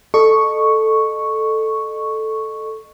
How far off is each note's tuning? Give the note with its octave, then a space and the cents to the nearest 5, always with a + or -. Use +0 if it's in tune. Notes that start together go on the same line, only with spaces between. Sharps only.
A4 +0 D#5 -30 C#6 +0